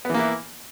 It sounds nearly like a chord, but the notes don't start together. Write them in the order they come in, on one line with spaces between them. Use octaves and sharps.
B3 E3 A#3 E4